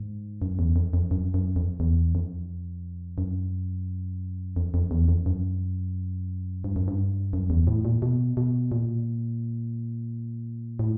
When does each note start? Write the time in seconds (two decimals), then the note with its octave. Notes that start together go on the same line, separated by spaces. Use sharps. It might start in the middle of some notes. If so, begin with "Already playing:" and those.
Already playing: G#2
0.42 F#2
0.59 E2
0.76 F2
0.93 F2
1.11 F#2
1.34 F#2
1.56 F2
1.80 E2
2.15 F2
3.18 F#2
4.56 F2
4.74 F2
4.91 E2
5.08 F2
5.26 F#2
6.64 G2
6.76 F#2
6.88 G2
7.33 F#2
7.50 E2
7.67 A2
7.85 A#2
8.02 B2
8.37 B2
8.72 A#2
10.79 A2